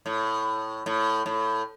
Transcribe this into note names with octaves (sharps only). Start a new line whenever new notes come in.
A2
A2
A2